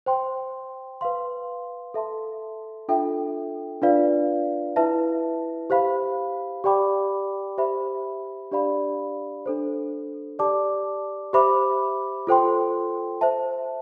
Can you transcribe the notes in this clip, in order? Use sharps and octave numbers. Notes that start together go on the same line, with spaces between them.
C5 G5 C6
B4 F5 C6
A4 E5 A5 C6
D4 F4 A4 E5 G5
D4 F4 B4 D5 F5
E4 B4 E5 A5
G4 C5 F5 B5
G4 D5 G5 B5 D6
G4 C5 E5 B5
D4 G4 D5 F5 B5
D4 A4 C5
G4 D5 A5 D6
G4 C5 E5 B5 D6
F4 A4 C5 G5 C6
C5 E5 A5